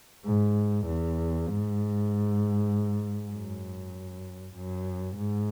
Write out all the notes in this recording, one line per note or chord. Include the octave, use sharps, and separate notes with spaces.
G#2
E2
G#2
F#2
F#2
G#2